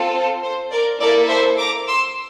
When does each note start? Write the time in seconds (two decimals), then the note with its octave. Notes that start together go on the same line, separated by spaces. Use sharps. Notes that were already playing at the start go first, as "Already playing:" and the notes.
Already playing: C4 F4 A4
0.14 C5
0.43 C5
0.72 A#4 D5
1.01 A#3 E4 A4 A#4 D5
1.30 C5 E5
1.59 A#5 D6
1.87 C6 E6